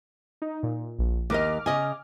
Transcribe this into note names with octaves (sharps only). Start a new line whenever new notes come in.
D#4
A#2
A#1
D#2 A#4 D#5 D6 F6
C#3 D#5 G#5